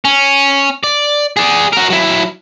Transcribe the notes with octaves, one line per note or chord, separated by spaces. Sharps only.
C#4
D5
G#4 D5
F#4 A#4
F#3 E4